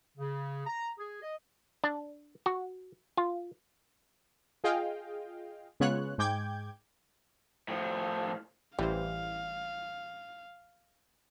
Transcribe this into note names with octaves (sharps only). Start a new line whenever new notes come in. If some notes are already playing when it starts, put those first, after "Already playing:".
C#3
A#5
G#4
D#5
D4
F#4
F4
F4 G#4 D#5 F5 G5
C#3 G#3 B3 F4 C#5 F#6
G#2 G#3 G5 D6 G6 G#6
A2 F3
A1 E3 G3 C5 F5